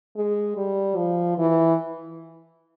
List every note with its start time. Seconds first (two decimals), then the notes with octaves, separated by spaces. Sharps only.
0.16 G#3
0.57 G3
0.97 F3
1.38 E3